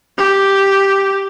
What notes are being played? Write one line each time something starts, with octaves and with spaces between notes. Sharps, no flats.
G4